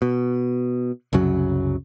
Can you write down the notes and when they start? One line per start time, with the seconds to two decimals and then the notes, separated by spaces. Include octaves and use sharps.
0.02 B2
1.13 C2 F#2 C#3 F#3